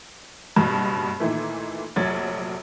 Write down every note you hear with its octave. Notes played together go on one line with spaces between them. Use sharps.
F#1 G2 B2
A#2 D#3 E3 A3
F1 A#1 F#3 C#5 A6